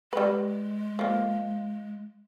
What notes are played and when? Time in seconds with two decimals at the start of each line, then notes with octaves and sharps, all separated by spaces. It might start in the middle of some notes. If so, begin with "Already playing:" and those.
0.13 G3 G#3 B4
0.99 F3 A#3